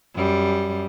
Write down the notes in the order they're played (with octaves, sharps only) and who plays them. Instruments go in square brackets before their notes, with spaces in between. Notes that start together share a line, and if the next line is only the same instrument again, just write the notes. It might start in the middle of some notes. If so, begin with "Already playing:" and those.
[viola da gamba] F#2 G3